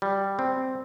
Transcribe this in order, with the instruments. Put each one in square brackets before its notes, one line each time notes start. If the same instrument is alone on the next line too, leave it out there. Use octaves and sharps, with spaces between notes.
[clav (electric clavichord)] G3
C4